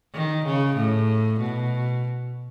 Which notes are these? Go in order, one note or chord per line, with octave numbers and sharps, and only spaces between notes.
D#3
C#3
A2
B2